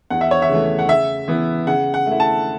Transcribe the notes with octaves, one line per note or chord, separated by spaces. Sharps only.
E2 F#5
E5
C#5
E5
C#3 E3 A3
F#5
C#3 E5
E3 B3 E4
C#3 F#5
F#5
A3
E4
A5